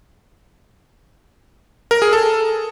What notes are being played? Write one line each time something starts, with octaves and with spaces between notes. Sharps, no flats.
A#4
G#4
A4